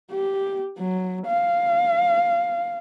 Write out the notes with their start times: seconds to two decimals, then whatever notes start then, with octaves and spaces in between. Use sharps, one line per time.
0.11 G4
0.79 F#3
1.27 F5